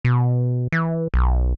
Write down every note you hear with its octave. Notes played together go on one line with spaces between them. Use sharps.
B2
E3
B1